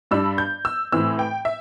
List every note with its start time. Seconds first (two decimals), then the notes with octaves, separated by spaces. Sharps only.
0.11 G2 G3 D4 E6
0.38 G6
0.65 E6
0.92 A2 E3 C4 E6
1.19 G5
1.45 E5